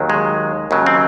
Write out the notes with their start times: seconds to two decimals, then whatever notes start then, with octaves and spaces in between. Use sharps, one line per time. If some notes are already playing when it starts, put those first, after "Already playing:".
Already playing: D#2 D#3 F#3
0.10 G#3
0.71 D#2 C#3 F#3
0.86 C4